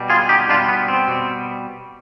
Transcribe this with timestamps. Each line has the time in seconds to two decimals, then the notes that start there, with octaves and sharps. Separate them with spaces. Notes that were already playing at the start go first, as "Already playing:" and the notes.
Already playing: B2 G3
0.10 F4 G#4
0.29 D#4 G4
0.48 B2 G3 D4 F4
0.69 B3
0.88 C4
1.08 B2 G3